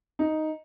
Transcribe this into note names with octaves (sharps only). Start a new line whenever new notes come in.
D#4